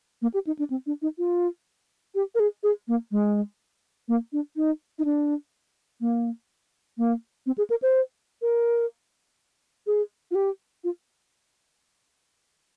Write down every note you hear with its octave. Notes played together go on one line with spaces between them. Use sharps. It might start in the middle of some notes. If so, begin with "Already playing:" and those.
A#3
G4
D#4
D4
C4
D4
D#4
F4
G4
A#4
G#4
G#4
A#3
G#3
A#3
D4
D#4
D#4
D4
A#3
A#3
C4
G#4
A#4
C5
A#4
G#4
F4
G4
F4